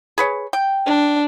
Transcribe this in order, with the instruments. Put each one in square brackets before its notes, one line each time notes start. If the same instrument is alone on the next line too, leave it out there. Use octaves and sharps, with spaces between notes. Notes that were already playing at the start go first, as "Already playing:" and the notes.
[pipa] G#4 B4 C#5
G5
[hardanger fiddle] D4